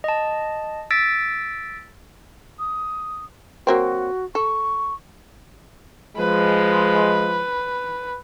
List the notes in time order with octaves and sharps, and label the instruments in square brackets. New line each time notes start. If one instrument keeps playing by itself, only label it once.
[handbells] D#5 A5
E6 A6 B6 D7
[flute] D#6
[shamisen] F#3 A#3 C4 [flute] F#4
[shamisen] A4 [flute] C#6
[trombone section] F3 G#3 [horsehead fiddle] B4